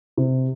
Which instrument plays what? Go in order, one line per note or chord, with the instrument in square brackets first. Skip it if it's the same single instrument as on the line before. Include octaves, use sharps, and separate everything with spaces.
[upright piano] C3